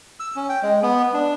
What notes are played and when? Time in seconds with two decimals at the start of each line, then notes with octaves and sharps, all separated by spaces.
0.20 E6
0.36 C#4
0.49 G5
0.63 G#3
0.83 B3
1.14 D4